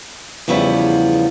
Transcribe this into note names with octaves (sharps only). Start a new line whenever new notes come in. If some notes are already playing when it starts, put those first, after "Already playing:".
E2 C#3 F3 G3 B3 E4